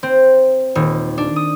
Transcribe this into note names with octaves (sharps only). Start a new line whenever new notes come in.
C4
D#1
D4
D#6